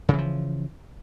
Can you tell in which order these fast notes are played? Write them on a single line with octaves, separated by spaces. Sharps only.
C#3 E3 F3